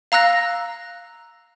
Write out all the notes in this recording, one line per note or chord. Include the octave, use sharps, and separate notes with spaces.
F5 A#5 E6 F#6 A#6